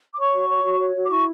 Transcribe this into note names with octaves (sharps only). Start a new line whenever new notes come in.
D6
C#5 C#6
F#4
C#5
F#4
C#5
F#4
D6
E4 C#6